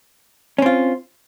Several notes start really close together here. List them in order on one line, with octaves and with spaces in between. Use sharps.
C#4 C4 F4